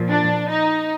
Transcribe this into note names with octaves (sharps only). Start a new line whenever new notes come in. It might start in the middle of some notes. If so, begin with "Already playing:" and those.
Already playing: A#2 F3
D4
D#4